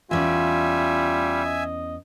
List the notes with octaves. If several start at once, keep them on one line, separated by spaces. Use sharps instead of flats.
E2 G3 C#4 F4 D5 E5 G#5
D#5